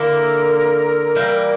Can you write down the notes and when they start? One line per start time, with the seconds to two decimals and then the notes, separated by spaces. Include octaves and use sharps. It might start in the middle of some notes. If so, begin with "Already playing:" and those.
Already playing: D3 A#3 E4 A#4
1.15 E3 G3 A#3